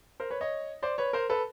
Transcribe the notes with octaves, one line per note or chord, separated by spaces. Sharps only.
A#4 C5
B4 C#5
C#5 D#5
C5 D5
B4 C#5
A#4 C5
A4 B4